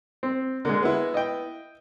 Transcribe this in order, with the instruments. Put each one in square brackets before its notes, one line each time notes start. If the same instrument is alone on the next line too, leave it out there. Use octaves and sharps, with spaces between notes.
[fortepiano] C4
[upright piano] D3 [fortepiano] G#3 A#3
[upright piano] B3 E4
[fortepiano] D#5 G5